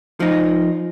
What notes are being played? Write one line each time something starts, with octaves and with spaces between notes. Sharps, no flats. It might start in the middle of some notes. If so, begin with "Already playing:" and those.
F3 D#4